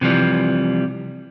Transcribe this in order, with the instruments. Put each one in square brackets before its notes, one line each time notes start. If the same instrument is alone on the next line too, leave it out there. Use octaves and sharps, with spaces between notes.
[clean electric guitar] C3 E3 F3 G3